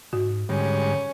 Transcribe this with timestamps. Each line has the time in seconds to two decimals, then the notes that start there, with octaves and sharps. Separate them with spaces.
0.13 G#2 F#4
0.49 G#2 D3 G3 C#4